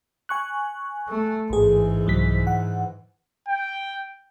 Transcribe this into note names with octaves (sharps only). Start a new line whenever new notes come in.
G#5 C#6 F#6
A3
A1 G#2 E3 G#4
C2 F#3 B6
F#5
G5